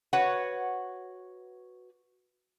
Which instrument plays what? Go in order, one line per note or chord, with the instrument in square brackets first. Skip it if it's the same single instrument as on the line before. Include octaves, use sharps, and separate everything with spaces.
[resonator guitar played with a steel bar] F#4 B4 C#5 F#5